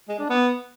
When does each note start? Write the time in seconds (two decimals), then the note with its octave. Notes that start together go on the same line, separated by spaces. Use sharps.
0.09 G#3
0.19 D4
0.30 B3